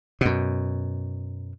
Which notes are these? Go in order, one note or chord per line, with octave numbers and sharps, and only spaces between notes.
F#2 B2